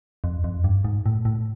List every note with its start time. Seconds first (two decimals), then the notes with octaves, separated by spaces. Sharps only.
0.24 F2
0.44 F2
0.64 G2
0.84 G#2
1.06 A2
1.25 A2